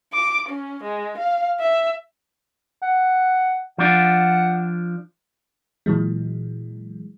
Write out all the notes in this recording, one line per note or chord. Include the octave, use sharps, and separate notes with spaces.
D6
C#4
G#3
F5
E5
F#5
F3 D4 F#5
A#2 E3 F#3 G#3